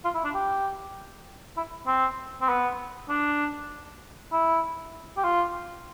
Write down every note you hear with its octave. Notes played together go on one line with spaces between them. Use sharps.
F4
E4
D4
G4
E4
C4
C4
B3
D4
E4
G4
F4